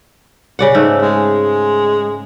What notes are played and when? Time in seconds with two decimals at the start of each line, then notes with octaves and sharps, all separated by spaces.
0.59 C#3 D5 F#5
0.75 G#2 A3
1.02 G#3